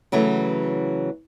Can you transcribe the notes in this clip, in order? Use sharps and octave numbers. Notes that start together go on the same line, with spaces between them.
C#3 E3 F#3 A3